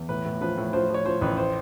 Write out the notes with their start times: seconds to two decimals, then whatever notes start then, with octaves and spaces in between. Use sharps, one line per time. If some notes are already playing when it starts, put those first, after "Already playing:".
Already playing: E2
0.09 A2 B4
0.25 A2
0.41 F3 B4
0.57 A2
0.73 F3 C5
0.90 F3 C#5
1.06 F3 C5
1.21 A1 B4
1.37 C5